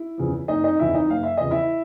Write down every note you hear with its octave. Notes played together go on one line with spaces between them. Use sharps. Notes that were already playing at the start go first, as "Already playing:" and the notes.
Already playing: E4
E2 C#3 F3
F#1 D#4 D#5
D#4 D#5
E2 C#3 F3 E4 E5
D#4 D#5
F#1 F5
E5
E2 C#3 F3 D#5
E4 E5